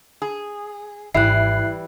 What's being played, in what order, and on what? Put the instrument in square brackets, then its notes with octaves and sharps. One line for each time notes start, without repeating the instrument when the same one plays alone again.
[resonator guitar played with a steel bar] G#4
[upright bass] G#1 [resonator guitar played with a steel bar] E3 G3 [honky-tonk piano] E4 [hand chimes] F#6 C7